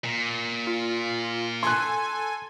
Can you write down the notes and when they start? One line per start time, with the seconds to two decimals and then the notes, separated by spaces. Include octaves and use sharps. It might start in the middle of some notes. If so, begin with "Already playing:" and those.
0.04 A#2
0.67 F4
1.63 A4 G#5 C6 F#6